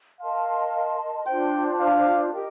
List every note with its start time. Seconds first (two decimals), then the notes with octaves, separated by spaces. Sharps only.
0.20 A#4 D#5 F5 A5 C6
1.26 D4 F4 C5 G5
1.79 F5
2.33 G4 A#4 D#5 G5